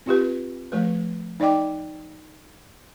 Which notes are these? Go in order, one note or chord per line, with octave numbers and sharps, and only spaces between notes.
C4 F4 G4 B4
F3 A3 B4
D#4 D5 D#5 G5 D6